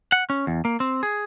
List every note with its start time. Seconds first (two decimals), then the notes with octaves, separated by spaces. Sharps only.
0.12 F#5
0.30 C#4
0.47 E2
0.65 A#3
0.80 C4
1.03 G#4